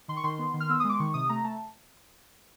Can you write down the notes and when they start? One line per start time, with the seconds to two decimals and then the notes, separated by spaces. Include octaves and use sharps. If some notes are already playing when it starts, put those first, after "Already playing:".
0.08 D#3 C6
0.17 C#6
0.24 D#3 C6
0.39 B3
0.54 D#3
0.60 F6
0.69 B3 E6
0.80 G#3 D#6
0.89 D6
0.99 D#3 C#6
1.14 C3 D#6
1.29 A3 A#5
1.44 A3 A5